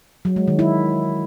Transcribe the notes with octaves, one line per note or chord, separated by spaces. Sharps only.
F#3
G#3
D#3
E4